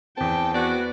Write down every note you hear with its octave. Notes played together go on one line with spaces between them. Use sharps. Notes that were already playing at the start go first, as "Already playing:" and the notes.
E2 C4 G5 A5
B3 F#4 D5